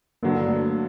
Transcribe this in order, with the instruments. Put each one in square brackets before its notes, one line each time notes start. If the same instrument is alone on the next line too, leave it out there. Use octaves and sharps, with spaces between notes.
[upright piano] G2 D3 F#3 [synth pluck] A#3
[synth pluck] A3